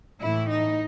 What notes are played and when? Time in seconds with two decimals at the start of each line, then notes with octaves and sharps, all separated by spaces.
0.20 A2 E3 E4
0.49 D#4